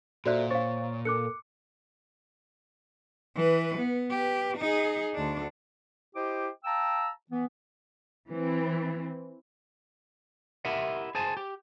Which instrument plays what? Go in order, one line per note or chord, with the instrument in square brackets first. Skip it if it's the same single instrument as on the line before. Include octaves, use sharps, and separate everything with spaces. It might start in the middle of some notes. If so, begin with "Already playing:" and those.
[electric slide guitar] A#2 [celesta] F#4 D5 F#6 [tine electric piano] A4 C5 E5
[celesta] C5 F5 [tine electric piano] C#5 C#6 A6
[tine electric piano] A4 A#4 [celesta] D6 F#6 C#7
[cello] E3 B4
B3
G4 B4
D#4 G#4
D2 D4
[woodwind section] E4 G4 C5 D#5 G5 D6
F5 G5 A5 A#5 E6
E3 B3
[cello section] E3 C4
[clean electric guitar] E4 G4 A#4 D#5 E5 F#5
G#4 C5 G#5 A5
G4